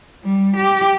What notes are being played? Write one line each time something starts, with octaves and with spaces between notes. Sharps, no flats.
G3
G4